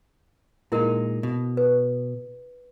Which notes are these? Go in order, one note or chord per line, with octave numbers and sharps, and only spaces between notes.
A#2 G#3 D#4 E4 A#4
B2
B4